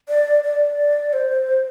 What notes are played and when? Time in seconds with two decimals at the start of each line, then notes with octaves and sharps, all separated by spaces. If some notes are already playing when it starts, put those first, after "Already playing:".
0.09 D5
0.44 D5
1.13 C5